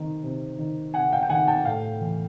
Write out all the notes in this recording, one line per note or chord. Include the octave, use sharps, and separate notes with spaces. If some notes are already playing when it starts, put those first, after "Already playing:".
Already playing: C3 D#3
C3
D#3
C3 F#5 G#5
F5 G5
G5
D#3 F#5 G#5
G5 A5
A2 F5 G5
E3